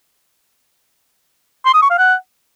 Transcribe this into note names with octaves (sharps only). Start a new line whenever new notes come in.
C6
D#6
C#6
F5
F#5